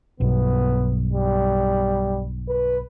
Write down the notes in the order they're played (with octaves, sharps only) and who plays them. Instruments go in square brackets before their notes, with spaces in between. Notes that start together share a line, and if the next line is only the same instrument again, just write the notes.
[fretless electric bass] B1 G2 [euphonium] B3
[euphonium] G3
B4